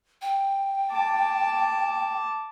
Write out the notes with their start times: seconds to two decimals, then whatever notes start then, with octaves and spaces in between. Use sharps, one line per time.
0.22 G5
0.91 A5 D6